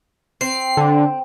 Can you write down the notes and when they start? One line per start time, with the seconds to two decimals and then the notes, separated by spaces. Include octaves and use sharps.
0.41 C4 C7
0.77 D3